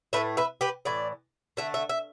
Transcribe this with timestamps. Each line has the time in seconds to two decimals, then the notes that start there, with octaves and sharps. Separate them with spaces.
0.13 A2 B4 E5
0.17 A3
0.37 B4 E5
0.61 G4 B4
0.85 A2 E3 D5
1.57 D3 A3 E5
1.74 E5
1.89 E5